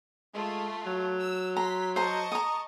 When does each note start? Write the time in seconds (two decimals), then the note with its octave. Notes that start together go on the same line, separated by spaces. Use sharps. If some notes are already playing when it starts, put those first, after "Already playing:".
0.35 G#3 A3 F4
0.86 F#3
1.19 E6
1.57 A#5 C6 B6
1.96 C5 D#5 A5 A#5 C#6
2.32 A#5 D#6